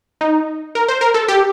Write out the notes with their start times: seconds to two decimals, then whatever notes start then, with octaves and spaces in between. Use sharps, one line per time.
0.21 D#4
0.75 A#4
0.88 C5
1.01 A#4
1.14 A4
1.28 G4